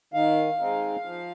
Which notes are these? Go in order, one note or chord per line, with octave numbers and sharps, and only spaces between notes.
D#3 F5
G#3 C4 D#4
F3